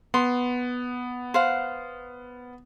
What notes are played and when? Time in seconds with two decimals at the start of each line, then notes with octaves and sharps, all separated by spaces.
0.14 B3 C6
1.34 C5 F5 F#5